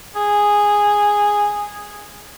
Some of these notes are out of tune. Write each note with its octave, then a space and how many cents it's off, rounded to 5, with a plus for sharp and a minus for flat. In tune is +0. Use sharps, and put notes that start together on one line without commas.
G#4 -10